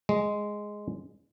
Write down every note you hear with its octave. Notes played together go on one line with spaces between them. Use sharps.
G#3